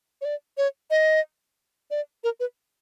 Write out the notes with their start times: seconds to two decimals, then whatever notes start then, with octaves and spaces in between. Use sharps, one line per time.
0.21 C#5
0.25 D5
0.58 C#5
0.90 D#5
1.91 D5
2.24 A#4
2.40 B4